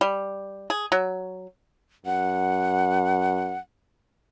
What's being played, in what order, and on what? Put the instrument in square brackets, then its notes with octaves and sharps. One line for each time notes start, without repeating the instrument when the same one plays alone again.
[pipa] G3
G#4
F#3
[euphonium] F#2 [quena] F#5